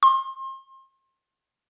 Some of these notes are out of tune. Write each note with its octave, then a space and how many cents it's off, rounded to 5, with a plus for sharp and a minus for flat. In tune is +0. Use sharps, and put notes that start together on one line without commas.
C6 +35